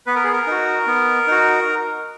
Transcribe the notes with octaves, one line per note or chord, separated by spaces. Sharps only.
B3 B4
A#4
G#4
A#4
D#4 F#4
B3
D#4 F#4